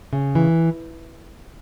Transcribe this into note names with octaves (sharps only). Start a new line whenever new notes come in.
C#3
E3